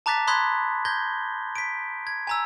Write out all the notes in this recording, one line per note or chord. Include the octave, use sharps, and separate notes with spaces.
A5 A#5 D6 F#6 A6 B6
B5 C6 D#6 F#6 G#6 B6
G6 G#6 A#6 G7
B6 D7
G#6
G#5 A#5 E6